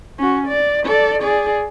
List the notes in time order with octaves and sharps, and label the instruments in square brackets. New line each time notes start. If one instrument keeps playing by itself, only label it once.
[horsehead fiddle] C#4 F#4
D5
A4 D5
G#4 D5